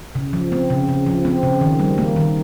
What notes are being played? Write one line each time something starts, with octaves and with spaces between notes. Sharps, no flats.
C#3
F3
C4
C#3
C#3
F3
C4
C#3
D#3
G3
A#3
D#3